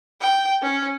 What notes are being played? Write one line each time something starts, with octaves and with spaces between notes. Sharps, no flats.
G5
C#4